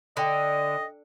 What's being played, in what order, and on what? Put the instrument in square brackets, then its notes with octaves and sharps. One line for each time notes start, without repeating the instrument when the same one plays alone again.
[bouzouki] D3 [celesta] A4 G5 [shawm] D#5